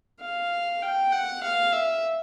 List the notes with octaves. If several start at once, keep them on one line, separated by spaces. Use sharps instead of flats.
F5
G5
F#5
F5
E5